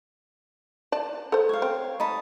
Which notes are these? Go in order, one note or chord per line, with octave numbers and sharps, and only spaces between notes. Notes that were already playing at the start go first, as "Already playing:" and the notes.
D5 A5
A4 C5
C#5 F5
C4
D#4 A5 B5